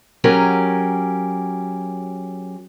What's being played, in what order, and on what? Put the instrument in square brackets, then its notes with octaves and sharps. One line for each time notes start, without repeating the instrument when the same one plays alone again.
[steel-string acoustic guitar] F#3 C#4 G4 G#4 A#4